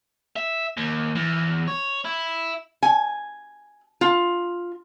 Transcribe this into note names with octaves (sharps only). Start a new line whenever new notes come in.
E5
D#2
E2
C#5
E4
G#5
F4